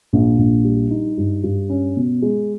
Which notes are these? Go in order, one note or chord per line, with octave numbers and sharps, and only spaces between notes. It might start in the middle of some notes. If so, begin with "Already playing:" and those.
A#1
A#1
G3
D#4
G2
G2
C#4
B2
G#3